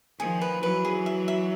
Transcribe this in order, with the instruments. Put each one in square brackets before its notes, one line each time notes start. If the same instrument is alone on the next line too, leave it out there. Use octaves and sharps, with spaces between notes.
[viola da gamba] D#3 F3 [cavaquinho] G#4
[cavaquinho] B4
[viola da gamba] E3 F#3 [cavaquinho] B4
[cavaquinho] G#4
E5
E5